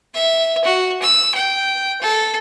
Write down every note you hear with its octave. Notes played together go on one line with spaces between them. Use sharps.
E5
F#4
E6
G5
A4